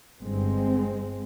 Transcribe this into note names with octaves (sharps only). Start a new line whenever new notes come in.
G1 G2 G#3 C4